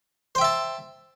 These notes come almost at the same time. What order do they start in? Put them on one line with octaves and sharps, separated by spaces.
C5 G5 E5 A5